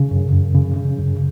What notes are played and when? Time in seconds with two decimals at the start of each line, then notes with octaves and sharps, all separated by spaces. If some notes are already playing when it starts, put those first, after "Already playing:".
Already playing: C#3
0.11 F#2
0.32 F#2
0.55 C#3
0.77 C#3
0.98 F#2